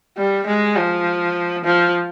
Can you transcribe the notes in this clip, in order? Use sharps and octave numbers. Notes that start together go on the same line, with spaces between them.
G3
G#3
F3
F3